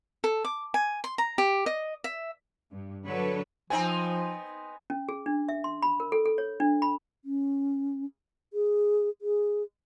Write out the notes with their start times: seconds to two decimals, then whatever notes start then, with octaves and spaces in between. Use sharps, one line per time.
0.24 A4
0.45 D6
0.74 G#5
1.04 C6
1.18 A#5
1.38 G4
1.66 D#5
2.04 E5
2.71 G2
3.05 D3 F#3 A4 B4 C#5
3.70 F3 B3 C4 D#4 G#5
4.90 C#4
5.09 G#4
5.26 D4
5.49 E5
5.64 C6
5.82 B5
6.00 A#4
6.12 A4
6.26 A4
6.38 C#5
6.60 D4
6.82 B5
7.25 C#4
8.53 G#4
9.22 G#4